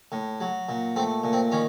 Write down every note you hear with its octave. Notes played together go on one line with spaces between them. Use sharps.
A2
F#3
A#2
A3 C4
A#2
C4
D#3 C#4